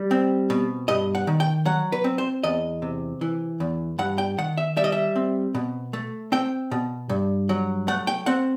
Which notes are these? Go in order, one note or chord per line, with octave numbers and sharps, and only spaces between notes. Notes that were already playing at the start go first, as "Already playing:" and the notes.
Already playing: G3
C4
B2
G2 D#5
F#5
D#3
G5
F#3 F#5
B4
C4
C5
E2 D#5
C3
E3
E2
G2 F#5
G5
D#3 F#5
E5
G3 E5
D#5
E5
C4
B2
A3
C4 G5
B2
G2
F#3
A3 F#5
G5
C4 F#5